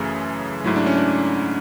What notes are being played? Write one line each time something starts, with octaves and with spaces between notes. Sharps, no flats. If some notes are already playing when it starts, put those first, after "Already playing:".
Already playing: F#2 C#3 E3 A3
G#2 F#3 A3 E4
D4
C#4
D4